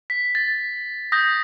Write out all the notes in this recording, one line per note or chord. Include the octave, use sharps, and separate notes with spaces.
B6
A6
D#6 G6 A#6